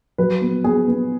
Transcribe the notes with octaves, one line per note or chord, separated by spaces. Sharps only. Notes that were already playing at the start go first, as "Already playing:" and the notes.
F#3 B4
B3
B3 G#4
B3